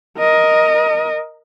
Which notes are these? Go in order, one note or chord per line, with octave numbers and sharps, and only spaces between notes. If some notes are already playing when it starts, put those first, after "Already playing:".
A#4 D#5